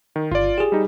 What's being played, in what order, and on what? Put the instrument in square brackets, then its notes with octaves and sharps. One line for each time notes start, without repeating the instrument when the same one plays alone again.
[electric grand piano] D#3
[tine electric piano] G1 [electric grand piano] F4 D5
[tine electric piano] G4 G#4
[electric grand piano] G3 D#4